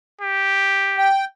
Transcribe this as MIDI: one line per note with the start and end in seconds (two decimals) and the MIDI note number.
0.21 1.08 67
0.98 1.25 79